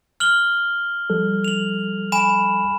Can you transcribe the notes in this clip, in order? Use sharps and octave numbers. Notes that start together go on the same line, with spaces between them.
F6 F#7 G7
F3 G3 A4
F7 F#7
G#5 B5 E7